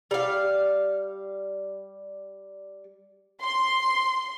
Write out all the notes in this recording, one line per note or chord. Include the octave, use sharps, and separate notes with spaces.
G3 F5
C6